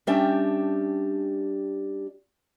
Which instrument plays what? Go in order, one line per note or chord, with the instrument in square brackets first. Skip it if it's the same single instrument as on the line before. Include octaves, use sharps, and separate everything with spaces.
[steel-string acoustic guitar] G3 C#4 D4 G4 E5 A5